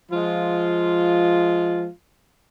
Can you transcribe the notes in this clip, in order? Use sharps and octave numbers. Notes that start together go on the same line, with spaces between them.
F3 G#3 F4